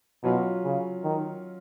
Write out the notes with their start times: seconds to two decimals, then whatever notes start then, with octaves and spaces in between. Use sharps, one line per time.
0.23 B2 F#3 C#4 F4
0.64 C#3
1.04 D#3